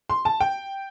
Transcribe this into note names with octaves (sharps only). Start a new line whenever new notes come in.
C6
A5
G5